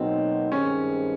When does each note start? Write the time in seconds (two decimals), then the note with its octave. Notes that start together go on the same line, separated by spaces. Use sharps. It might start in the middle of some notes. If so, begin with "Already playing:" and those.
Already playing: B2 F#3 A#3 C4 D#4
0.52 G2 D#3 G#3 C4 C#4